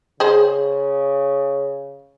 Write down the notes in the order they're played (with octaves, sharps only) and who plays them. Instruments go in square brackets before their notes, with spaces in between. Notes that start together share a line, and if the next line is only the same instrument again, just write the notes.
[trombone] C#3 [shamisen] G#4 C5